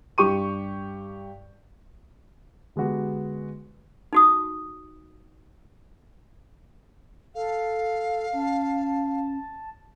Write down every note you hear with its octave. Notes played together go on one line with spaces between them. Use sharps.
G2 G4 C#6 D#7
D3 G#3 B3 F#4 G4
D#4 F#4 D#6
A4 F5
C#4 A5